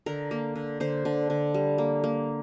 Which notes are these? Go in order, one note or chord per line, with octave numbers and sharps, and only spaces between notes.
D3 A#4
A#3
D3
D3 C5
D3
D3
G3
A#3
A#3